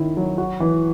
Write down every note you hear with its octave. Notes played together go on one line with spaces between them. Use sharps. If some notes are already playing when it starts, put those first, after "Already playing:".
Already playing: D#3 C#4 E4
F#3
F#4
E3